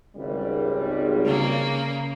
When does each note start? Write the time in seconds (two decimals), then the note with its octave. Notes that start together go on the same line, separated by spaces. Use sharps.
0.16 G#1 C#2 G3
1.25 C#3 A#3